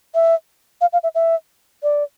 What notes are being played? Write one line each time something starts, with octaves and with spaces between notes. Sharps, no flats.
E5
F5
F5
E5
E5
D5